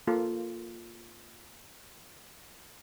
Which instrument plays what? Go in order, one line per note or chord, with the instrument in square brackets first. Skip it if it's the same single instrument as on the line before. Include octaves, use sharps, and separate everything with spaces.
[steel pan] A#3 F4 A4